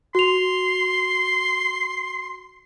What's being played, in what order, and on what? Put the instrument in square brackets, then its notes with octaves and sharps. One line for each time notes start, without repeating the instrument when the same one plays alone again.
[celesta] F#4 F7 [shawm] C6